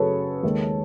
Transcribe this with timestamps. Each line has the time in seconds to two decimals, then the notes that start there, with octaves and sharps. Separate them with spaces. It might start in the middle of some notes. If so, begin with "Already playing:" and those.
Already playing: F#2 C#3 F#3 F#4 G#4 A4 B4 C#5
0.43 D#2 D#3 G#3